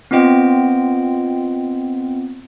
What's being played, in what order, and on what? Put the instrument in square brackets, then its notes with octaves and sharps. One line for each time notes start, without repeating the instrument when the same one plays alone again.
[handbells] B3 C4 F4 D#5 G5